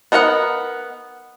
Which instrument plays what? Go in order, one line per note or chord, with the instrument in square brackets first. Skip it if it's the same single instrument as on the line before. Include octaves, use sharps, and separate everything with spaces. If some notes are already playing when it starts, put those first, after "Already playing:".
[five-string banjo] B3 D#4 A#4 D#5 F#5